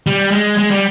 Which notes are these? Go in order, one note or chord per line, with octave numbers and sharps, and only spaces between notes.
G3
G#3
G#3
G3